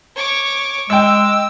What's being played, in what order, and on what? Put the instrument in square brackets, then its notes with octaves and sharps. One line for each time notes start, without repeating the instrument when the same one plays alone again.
[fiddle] C#5 D6
[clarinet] G#3 [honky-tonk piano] D#5 G5 [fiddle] D6 [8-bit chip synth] E6